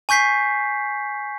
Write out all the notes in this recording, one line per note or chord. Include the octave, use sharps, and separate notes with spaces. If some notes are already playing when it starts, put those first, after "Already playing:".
G#5 C#6 G6 B6 C7